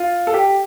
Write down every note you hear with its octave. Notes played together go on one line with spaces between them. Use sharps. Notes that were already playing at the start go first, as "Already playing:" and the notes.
Already playing: F4
A4
G4